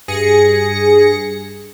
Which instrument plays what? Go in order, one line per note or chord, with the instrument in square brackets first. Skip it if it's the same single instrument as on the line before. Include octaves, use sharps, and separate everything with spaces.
[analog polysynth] G2 G#4 A#6 C#7